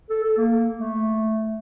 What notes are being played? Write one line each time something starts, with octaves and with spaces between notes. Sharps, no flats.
A4
A4
A#3
A3